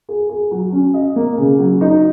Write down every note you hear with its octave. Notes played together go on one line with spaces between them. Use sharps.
G#4
G#4
F#3
C#4
D#5
A#3
C#3
F#3
D#4